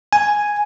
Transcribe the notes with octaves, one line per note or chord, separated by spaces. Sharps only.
G#5